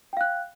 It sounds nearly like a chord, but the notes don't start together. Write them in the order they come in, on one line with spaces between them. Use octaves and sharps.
G5 F5 F#6